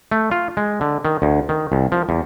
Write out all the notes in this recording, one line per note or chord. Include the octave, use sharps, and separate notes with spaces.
A3
F4
G#3
D3
D#3
D2
D#3
C2
F3
E2